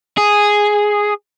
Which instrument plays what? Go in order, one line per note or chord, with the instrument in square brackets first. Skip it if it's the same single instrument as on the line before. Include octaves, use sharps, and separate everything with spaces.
[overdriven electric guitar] G#4